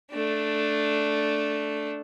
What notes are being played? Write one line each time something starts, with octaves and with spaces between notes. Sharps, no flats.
A3 D4